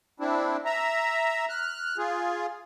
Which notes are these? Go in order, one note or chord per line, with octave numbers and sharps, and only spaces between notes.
C4 D4 E4
E5 A#5
F6 F#6
F4 G#4